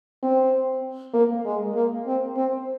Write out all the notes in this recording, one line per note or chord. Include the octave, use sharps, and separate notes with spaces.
C4
A#3
G#3
A#3
C4
C4